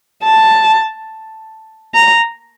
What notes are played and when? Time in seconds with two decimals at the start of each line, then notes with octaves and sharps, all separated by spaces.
0.24 A5
1.95 A#5